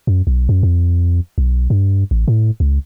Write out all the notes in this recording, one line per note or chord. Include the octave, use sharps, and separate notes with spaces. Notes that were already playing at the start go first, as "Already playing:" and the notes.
F#2
B1
F#2
F2
B1
G2
A1
A2
C#2